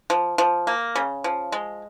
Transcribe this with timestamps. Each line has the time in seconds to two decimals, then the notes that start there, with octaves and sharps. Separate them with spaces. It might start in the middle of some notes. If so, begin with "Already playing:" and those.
0.10 F3
0.38 F3
0.67 A#3
0.96 C#3
1.24 F3
1.52 G#3